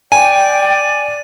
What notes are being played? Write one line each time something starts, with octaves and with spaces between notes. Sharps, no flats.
D5 G5 G#5 D#7